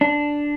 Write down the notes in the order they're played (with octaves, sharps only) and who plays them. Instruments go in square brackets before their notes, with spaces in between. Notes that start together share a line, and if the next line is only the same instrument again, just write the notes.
[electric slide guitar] D4